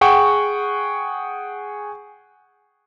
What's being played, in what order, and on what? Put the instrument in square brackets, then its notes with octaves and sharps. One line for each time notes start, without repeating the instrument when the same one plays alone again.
[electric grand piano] G#4 F#5 G5 C#6